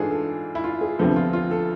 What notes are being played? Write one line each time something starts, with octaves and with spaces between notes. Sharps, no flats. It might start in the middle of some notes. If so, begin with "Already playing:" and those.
Already playing: G#2 E3 D4 F4 G#4 A4
A4
E4
F4
G#4
D2 C3 F3 B3 A4
F4
F4
A4